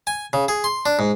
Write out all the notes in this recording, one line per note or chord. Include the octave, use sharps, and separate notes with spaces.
G#5
C#3
G#4
C6
D4
G#2